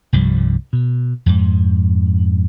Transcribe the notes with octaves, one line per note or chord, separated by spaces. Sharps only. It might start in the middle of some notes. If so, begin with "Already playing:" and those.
C2 G2 F3 G3
B2
F2 G#2